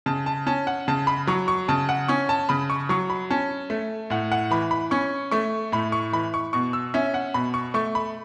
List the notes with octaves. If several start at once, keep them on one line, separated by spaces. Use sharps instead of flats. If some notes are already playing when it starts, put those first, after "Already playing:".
C#3 A5
A5
C#4 A5
F#5
C#3 A5
B5
F#3 C#6
C#6
C#3 A5
F#5
C#4 C#6
A5
C#3 B5
C#6
F#3 C#6
B5
C#4 A5
A3
A2 F#5
F#5
E3 B5
B5
C#4 C#6
A3 C#6
A2 B5
C#6
E3 B5
C#6
B2 C#6
E6
C#4 E5
F#5
B2 B5
C#6
A3 C#6
B5